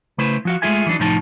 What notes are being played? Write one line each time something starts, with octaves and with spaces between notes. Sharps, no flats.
C#3 A3 E4 B4 C5
F3 F#4 F5
G#3 A3 F4 G#4 E5 G#5
E3 F#3 D4 D#4
C2 A2 F3 D#4 A5